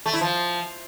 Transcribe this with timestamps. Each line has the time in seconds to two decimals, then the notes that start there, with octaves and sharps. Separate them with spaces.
0.06 A3
0.13 E4
0.21 F3